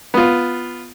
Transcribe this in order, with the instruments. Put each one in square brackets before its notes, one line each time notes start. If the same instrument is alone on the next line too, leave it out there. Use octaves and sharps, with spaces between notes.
[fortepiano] B3 F4